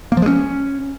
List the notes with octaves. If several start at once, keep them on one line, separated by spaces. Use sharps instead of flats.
A#3
F3
G#3
C#4